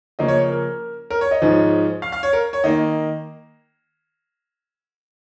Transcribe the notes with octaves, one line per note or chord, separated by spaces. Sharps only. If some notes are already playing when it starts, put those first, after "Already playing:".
C#3 F3 A#3 C#4 D#5
C#5
A#4
A#4
C#5
D#5
G#2 F3 C#4
F5
F5
C#5
A#4
C#5
D#3 A#3 D#4 D#5